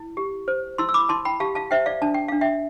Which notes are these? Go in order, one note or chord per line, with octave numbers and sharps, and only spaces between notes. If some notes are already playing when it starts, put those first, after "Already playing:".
Already playing: E4
G4
C5
E4 C6 E6
E6
B5 D6
E4 A5 C6
G5 B5
G4 F5 A5
F5 A5
C5 E5 G5
D5 F5
D4 A5
G5
D4 F5
E5 G5